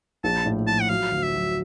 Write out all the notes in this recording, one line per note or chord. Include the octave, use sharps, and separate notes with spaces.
A#1 A5
A2
F3 A5
F#5
F#3 F5
D2
E5
F#3